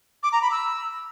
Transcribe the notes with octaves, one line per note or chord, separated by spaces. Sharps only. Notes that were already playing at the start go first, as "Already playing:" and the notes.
D6
A#5
B5
E6